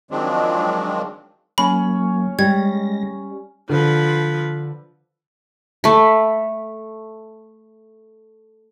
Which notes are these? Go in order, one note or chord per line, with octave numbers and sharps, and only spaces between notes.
D#3 F3 F#3 G#3 C4 D4
F#3 A#3 C#4 B5
G3 G#3 G#6 A#6
D3 F3 B4
A3 B5